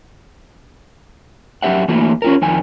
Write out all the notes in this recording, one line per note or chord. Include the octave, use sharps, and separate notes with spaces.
F#2 A3 G4 E5 F#5
E3 A3 A#3 F#4
C#4 F4 A#4
F2 D#3 G#5